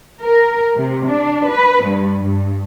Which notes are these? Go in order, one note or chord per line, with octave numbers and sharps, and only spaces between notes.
A#4
C3
D4
B4
G2
G2